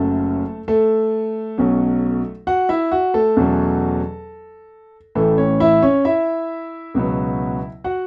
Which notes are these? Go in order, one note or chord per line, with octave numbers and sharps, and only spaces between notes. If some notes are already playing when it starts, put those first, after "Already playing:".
Already playing: F#1 F#2 F#3 A3 C#4 A4
A3 A4
B1 B2 F#3 C#4
F#4 F#5
E4 E5
F#4
A3 A4
E2 B2 F#3 A3 C#4
A1 A2 E3 A3 C#4 A4
C#4 C#5
E4 E5
C#4 C#5
E4 E5
C#2 B2 F#3 B3
F#4 F#5